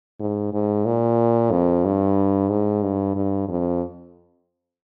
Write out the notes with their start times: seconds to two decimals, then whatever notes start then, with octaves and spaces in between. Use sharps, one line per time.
0.20 G#2
0.53 G#2
0.86 A#2
1.51 F2
1.85 G2
2.49 G#2
2.83 G2
3.15 G2
3.48 F2